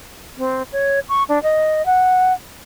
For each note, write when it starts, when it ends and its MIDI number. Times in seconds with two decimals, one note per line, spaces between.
0.38 0.63 60
0.73 1.00 73
1.09 1.24 85
1.29 1.42 62
1.43 1.85 75
1.86 2.33 78